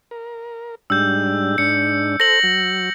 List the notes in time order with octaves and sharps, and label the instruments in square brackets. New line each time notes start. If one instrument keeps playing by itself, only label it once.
[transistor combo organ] A#4
[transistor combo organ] G#2 G3 D4 [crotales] E6 G6
[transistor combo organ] G#2 D4 [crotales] C#7
[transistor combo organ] A4 C5 [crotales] A#6 F#7
[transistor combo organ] F#3